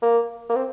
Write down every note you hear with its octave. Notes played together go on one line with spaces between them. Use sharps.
A#3
A#3
C4